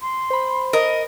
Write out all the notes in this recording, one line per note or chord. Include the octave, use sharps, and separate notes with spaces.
C6
C5 B5
A#4 D#5